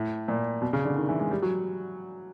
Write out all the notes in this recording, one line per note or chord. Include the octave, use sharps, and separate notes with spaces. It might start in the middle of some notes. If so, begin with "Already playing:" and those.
Already playing: A2
A#2
B2
C#3
D3
D#3
E3
G#3
G3
F#3